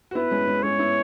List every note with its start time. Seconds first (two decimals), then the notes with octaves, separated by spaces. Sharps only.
0.11 F#4
0.15 B3 E4 B4
0.31 G#3 C#4
0.47 G#3 C#4
0.63 G#3 C#4 C#5
0.79 B3 E4